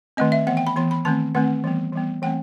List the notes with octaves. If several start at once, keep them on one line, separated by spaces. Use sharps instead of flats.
D#3 A3 C4 D#5
E5
E3 B3 F#5
G5
B5
E3 B3 C6
B5
D#3 A3 C4 A5
D#3 A3 C4 F#5
E3 G3 B3
E3 G3 B3
E3 A3 C4 G5